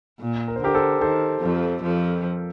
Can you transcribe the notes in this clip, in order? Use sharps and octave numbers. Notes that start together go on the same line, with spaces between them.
A#2
A#4
C5
D3 G4 A#4
A4 C5
D#3 A4 C5
F2 F3
F2 F3